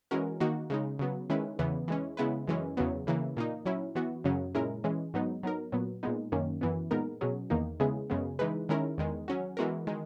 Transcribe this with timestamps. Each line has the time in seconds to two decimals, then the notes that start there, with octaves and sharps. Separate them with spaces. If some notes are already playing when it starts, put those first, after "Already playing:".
0.11 E3 G#3 C#4 F#4 A#4
0.40 D#3 A#3 D#4 F#4
0.70 C#3 G#3 D#4
0.99 C#3 F#3 B3
1.30 D#3 G#3 C#4 E4 B4
1.59 E2 C#3 E3 B3
1.88 E3 G#3 C#4
2.17 C#3 G#3 B3 E4 B4
2.47 F#2 E3 G#3 C#4
2.77 E2 C#3 F#3 B3
3.07 C#3 E3 A#3
3.37 A#2 A#3 D#4
3.66 F#3 C#4 E4
3.95 E3 B3 F#4
4.24 F#2 C#3 F#3 C#4
4.55 A#2 G#3 C#4 E4 A#4
4.84 E3 G#3 C#4
5.14 G#2 F#3 B3 D#4
5.43 F#3 B3 D#4 A#4
5.72 A#2 F#3 B3
6.03 A#2 G#3 B3 D#4
6.32 F#2 D#3 A#3 C#4
6.61 F#2 E3 B3
6.91 A#2 G#3 B3 D#4 A#4
7.21 B2 F#3 C#4 G#4
7.50 E2 D#3 A#3 D#4
7.80 C#3 G#3 B3 E4 G#4
8.10 F#2 C#3 G#3 B3
8.39 E3 G#3 D#4 G#4 B4
8.69 D#3 G#3 C#4 E4 A#4
8.98 E2 D#3 G#3
9.28 F#3 C#4 F#4
9.57 E3 G#3 B3 F#4 A#4
9.87 D#3 G#3